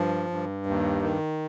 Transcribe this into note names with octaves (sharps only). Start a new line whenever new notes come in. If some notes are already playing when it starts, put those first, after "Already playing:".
Already playing: G2 F3
G2
D#2
D#3